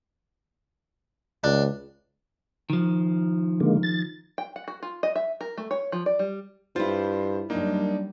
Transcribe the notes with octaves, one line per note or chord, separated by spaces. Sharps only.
C#2 D4
D#3 F3
D3 G#3 A#3
A6
G5
F#5
F#4
F4
D#5
E5
A#4
A3
C#5
F3
D5
G3
G2 E4 F4 C5
F#2 G3 A#3 D4 D#4